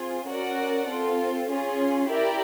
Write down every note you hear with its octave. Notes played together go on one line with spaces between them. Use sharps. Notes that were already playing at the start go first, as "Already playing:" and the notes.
Already playing: C4 F4 G#4
C#4 F#4 A#4 D5 F#5
C4 F4 A4
C#4 F4 G#4
E4 G4 A#4 D5